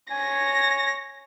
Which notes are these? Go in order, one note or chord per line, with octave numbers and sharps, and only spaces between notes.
C#5 G#5 A#6